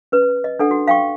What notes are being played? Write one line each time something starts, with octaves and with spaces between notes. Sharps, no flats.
C#4 B4
D#5
D4 A4 F#5
F#4
F5 G5 C#6